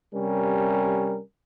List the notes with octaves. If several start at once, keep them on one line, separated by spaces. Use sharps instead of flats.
C3 G3 C#4 A#4